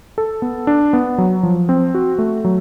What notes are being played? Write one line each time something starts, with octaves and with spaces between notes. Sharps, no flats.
A4
B3
D4
B3
F#3
F3
C4
F#4
A3
F#3